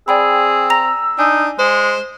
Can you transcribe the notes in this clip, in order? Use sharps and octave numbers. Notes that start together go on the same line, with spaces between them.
C4 G#4 D5 G5 B5 E6
A#5 A#6 F7
D4 D#4 G#5
G#3 C5